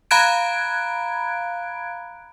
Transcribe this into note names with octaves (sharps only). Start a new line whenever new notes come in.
F5 A#5 B5 F#6 G#6 D7